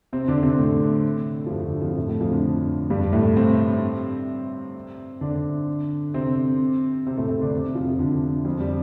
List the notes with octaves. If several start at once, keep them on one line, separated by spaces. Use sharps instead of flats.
C3 C4
D3 D4
C3 C4
A2 A3
F3
G2 G3
D3
F2 F3
A2 A3
A2 A3
F2 F3
D3
G2 G3
A2 A3
C3 C4
D3 D4
C3 C4
C3 C4
A2 A3
C3 C4
D3 D4
C3 C4
F2 F3
C3
D3
F2 F3
G3